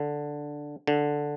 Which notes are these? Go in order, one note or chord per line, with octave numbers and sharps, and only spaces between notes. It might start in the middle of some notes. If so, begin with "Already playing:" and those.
Already playing: D3
D3